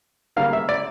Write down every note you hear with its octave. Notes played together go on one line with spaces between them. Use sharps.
C#3 G3 A#3 F5
E5
D5